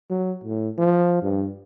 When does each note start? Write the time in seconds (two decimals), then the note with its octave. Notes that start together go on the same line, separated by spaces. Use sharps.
0.10 F#3
0.44 A2
0.78 F3
1.22 G2